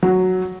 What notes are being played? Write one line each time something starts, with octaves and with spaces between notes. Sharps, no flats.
F#3